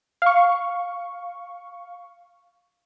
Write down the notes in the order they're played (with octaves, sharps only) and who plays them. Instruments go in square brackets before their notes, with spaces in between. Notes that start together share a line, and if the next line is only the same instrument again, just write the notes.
[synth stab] F5 C#6